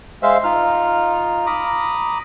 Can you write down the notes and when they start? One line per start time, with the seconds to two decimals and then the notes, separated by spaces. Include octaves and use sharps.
0.23 G#3 C5 E5 F5
0.44 D#4 F4 F6
1.47 A#5 B5 D6 D#6